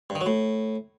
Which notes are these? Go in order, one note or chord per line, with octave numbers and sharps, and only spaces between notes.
G2
D#3
F#3
A2